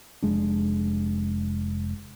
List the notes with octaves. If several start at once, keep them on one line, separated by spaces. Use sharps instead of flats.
F1 G#3 D4